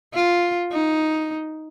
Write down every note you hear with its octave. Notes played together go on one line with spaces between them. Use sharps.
F4
D#4